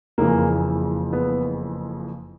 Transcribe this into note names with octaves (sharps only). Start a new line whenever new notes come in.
F#1 F2 C#3 E3 A#3
B3